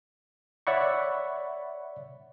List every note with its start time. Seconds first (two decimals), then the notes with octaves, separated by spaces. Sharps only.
0.67 C#5 D5 E5 F#5 B5 C#6